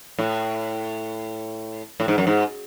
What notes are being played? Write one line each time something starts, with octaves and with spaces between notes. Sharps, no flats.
A2
A2
G#2
F#2
G#2